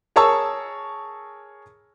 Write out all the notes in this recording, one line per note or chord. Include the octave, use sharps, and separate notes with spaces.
G#4 A#4 C#5 A5 C#6 E6